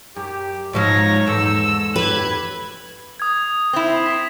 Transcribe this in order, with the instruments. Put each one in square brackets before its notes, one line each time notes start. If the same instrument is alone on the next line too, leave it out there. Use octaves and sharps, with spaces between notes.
[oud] F#2 [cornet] G4
[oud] G#2 F3 F#3 [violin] D#4 A#6 [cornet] C#5
[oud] E2 G#2 [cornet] A4 [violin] E6
[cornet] G4 [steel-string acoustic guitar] B4 [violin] F#6 G#6
[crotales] D#6 G#6
[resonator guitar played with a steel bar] C4 E4
[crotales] B6